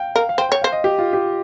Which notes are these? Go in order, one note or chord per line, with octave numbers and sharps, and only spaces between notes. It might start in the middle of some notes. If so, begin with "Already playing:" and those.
Already playing: F5 G5
A#4 F5
F5
C5 G5
C#5 G5
F5
C5
D#5
G4
F4
G4